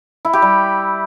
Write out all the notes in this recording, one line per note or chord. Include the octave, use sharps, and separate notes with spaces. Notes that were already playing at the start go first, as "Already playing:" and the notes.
E4
G4
G3